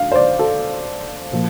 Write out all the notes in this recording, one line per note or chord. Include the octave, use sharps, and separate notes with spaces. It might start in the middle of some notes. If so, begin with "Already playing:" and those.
Already playing: D3 F5
C5
D5
A4
A#2 F3 A#3